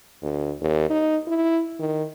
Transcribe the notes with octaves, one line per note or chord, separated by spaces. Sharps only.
D2
D#2
D#4
E4
D#3